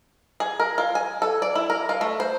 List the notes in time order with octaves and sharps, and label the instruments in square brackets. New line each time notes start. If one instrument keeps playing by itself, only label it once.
[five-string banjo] G#4
A#4
F4
G#5
A4
D5
E4
A#4
F4
A3
C5